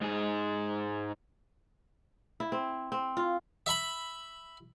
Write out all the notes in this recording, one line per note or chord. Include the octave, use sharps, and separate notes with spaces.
G#2 G#4
E4
C4
C4
F4
E5 B5